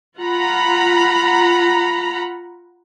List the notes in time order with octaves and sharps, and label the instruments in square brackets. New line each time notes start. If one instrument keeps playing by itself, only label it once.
[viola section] F4 F#5 A#5 B5